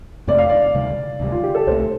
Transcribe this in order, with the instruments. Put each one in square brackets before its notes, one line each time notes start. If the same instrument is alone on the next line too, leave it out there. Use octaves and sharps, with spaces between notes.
[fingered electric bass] F2 C3 A3 C4 [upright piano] D5
[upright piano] F5
D5
[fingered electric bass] D2 C3 G3
D2 C3 G3
[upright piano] F4
G4
A4
[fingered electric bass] C2 C3 A3 [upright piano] C5